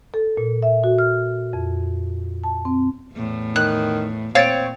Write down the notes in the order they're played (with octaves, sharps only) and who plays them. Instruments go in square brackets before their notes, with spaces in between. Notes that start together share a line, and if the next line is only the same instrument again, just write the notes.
[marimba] A4
A#2
E5
F#4
F6
F2
A5
C4
[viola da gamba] E2 A2
[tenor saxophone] D#3 [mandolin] F#6
[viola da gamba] A#2 [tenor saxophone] C4 [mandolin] C#5 [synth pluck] F5 A6 D7